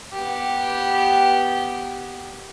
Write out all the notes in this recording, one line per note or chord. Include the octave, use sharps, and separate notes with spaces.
B3 G4